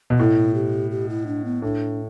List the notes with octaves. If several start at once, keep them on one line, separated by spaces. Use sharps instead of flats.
B2
A2 E4
G4
G4
E4
D4
B3
A2 D4